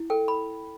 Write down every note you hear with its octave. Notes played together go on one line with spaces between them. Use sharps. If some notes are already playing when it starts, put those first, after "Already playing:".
Already playing: E4
A4 G5
B5